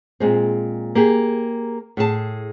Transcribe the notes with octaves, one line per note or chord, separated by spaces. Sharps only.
A#2 G#3 C4
A#3 G4 G#4
A2 G#4 A5